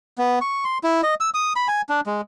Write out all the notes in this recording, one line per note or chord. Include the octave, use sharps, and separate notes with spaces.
B3
C#6
C6
E4
D#5
E6
D#6
B5
G#5
D4
G#3